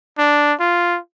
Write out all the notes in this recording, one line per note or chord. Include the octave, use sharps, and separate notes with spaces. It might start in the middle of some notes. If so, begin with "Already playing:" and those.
D4
F4